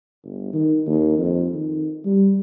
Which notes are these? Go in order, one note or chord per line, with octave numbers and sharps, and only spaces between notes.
G1
D#3
D#2
F2
D#3
G3